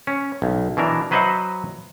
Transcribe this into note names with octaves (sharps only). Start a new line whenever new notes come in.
C#4
B1
B2 E3 D4 A#4
F#3 B4 C5 D#5 E5 F#5